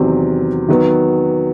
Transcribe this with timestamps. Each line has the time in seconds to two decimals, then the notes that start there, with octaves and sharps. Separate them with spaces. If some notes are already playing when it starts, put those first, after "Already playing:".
Already playing: E2 C3 D#3 F#3 C4
0.68 D#3 F#3 B3